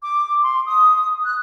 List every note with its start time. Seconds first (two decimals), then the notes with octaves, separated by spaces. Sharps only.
0.03 D6
0.42 C6
0.66 D#6
1.25 F#6